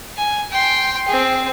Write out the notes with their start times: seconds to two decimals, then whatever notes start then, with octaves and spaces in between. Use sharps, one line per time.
0.17 G#5
0.51 G5 C6
1.08 C4 G#4